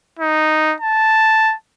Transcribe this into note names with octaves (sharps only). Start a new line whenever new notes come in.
D#4
A5